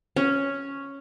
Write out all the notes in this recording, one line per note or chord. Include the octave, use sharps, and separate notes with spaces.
C#4